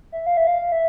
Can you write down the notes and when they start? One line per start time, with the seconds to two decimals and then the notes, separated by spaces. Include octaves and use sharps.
0.12 E5
0.26 F5
0.37 E5
0.47 F5
0.72 E5